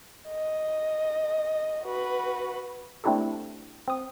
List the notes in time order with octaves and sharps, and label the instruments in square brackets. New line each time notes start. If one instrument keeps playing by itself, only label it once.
[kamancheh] D#5
F#4 B4
[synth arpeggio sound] A3 C4 D4 E4 G4 A4
C4 D#6